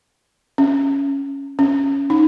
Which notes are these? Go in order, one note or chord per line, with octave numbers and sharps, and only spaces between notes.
C#4
C#4
D#4